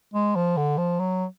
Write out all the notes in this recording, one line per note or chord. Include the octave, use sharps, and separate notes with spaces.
G#3
F3
D3
F3
F#3